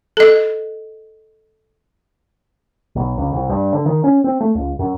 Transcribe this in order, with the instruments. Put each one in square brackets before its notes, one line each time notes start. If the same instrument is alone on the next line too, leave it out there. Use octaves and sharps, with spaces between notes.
[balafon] A4 D#5
[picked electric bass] B1
C#2
C2
G2
D3
D#3
C#4
C4
A3
C#2
F#2